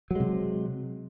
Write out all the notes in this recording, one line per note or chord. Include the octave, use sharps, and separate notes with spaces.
C3 F#3 G#3